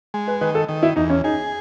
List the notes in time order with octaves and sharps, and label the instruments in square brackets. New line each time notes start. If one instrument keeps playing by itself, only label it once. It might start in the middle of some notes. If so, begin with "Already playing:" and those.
[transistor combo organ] G#3
[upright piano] B4
[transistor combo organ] D#3 [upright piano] B4
[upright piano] A4
[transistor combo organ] D#3
[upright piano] E4
[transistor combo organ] E2 [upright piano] D#4
[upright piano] C#4
[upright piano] D#4 [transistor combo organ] G#4